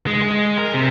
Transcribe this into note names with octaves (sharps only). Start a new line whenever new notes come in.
G#3
G#3
A#4
C3